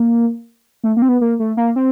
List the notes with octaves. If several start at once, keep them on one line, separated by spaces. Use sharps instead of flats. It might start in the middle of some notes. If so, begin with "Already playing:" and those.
Already playing: A#3
A3
A#3
C4
B3
A#3
A3
A#3
C4